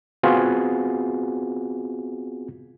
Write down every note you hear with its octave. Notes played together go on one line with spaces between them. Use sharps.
B3 C4 F4 F#4 G#4